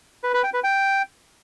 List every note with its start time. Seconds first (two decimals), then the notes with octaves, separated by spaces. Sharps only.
0.23 B4
0.33 B4
0.44 G5
0.54 B4
0.64 G5